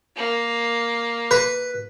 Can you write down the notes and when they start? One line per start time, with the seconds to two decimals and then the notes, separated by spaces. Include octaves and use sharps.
0.16 A#3
1.31 B4